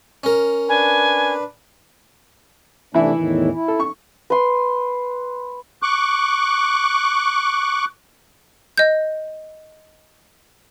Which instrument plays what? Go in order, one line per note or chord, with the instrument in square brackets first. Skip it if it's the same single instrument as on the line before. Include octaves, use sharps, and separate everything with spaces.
[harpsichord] C#4 A#4
[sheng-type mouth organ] D4 B4 [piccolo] G#5
[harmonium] C3 A3 D4 [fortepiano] E3 E4
[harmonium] E2 A2 D#3
E4
[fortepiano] A4
C#6
[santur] B4 C6
[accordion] C#6 D6 F#6
[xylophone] D#5 G6